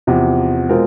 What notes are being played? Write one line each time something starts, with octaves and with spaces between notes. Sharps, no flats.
E2 C3 F3
B2 G#3 C4 F4 A#4